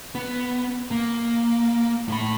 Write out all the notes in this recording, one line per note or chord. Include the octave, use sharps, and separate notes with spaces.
B3
A#3
A2 B5